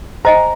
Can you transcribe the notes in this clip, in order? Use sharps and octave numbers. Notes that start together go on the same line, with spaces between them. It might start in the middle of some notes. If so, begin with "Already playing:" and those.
C5 D#5 G#5 A#5